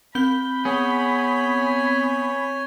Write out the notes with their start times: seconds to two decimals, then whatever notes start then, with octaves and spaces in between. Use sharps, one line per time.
0.15 C4 B5 G6 G7
0.65 B3 G#4 C#5 G#5